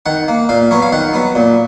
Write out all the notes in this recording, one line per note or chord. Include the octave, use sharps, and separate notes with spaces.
D#3 F#5
A#3
A#2 F5
F#3 B3 C#5
F5
D#3 F#5
F#3 B3
A#2